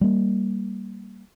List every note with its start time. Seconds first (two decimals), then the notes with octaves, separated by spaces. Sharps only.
0.01 G3 A#3